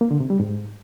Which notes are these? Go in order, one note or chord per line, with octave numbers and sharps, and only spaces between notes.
A#3
D3
C3
G3
G#2